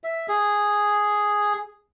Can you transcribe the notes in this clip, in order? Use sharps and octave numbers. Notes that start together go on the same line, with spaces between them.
E5
G#4